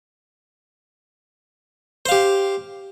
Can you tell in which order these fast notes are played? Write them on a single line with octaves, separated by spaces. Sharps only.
C5 F5 G4